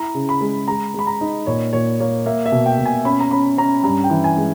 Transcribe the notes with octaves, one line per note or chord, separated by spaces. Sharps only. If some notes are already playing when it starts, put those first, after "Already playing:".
Already playing: E4 A#5
C#3
B5
G#3
G#3 A#5
G#3 B5
A#5
D#4
A#2 C#5
A#2 C#5
A#3 C#5
A#3 E5
E5
B2
G5
B2
G#5
C#4 B5
A#5
C#4 B5
C#4 A#5
G2 A#5
G5
E3
G#5
G#3